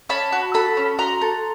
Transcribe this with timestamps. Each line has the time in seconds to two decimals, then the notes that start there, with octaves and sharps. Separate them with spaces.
0.09 C#4 A5 B5
0.32 F#4
0.54 A4 A5 B5
0.77 C#4
0.98 F#4 A#5 C6
1.21 A4